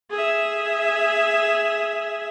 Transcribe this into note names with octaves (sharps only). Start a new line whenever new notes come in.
G#4 E5